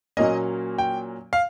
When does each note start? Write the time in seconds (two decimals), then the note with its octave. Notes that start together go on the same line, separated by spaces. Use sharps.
0.17 A#2 F#3 A#3 C#4 D#5
0.78 G5
1.33 F5